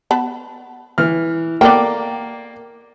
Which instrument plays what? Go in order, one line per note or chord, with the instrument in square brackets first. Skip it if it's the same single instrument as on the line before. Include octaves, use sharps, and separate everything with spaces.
[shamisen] B3 A5 B5
[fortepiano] E3 F6
[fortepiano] A#3 D5 [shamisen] B3 A4 G5